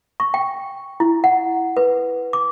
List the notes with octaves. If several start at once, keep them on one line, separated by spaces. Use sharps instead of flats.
C#6
G5
E4
F#5
B4
D6